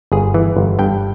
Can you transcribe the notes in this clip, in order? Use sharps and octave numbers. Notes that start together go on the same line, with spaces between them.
G1 G#4
E3
G1
G2 G5